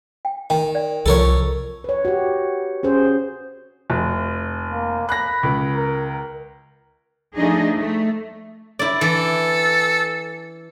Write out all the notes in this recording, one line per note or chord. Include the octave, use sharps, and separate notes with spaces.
G5
D#3 G5
D5
C2 E3 F3 A4 A#4 C#5
B4 C#5
F#4 G4
C#4 G#4 C5
F1
A#3
B5 F#6 A#6
C#2
A#4
F3 A3 D4 D#4 G#4 D#5
A3
E4 D5
E3 A4